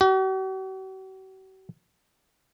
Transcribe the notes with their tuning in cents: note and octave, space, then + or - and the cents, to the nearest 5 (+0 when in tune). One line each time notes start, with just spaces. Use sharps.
F#4 +45